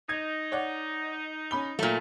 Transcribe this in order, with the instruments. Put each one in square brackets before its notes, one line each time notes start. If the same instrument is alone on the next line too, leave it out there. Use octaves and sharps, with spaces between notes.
[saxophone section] D#4 [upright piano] G#6
[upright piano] C#5 D5 F#5
C#4 B5 G7
[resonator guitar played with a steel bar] A#2 A3 [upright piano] F#3